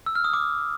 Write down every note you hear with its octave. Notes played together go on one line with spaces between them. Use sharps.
E6
F6
D#6
D6